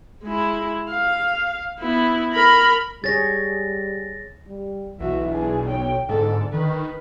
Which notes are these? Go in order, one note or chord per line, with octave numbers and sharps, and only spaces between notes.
G#3 E4
F5
B3 E4
A#4 B5
G3 G#4 C#5 A6 A#6
G3
B1 E3 F#4 E5
D4 G#4
C#5 G5
G#2 D3 A4 D5
D#3 B4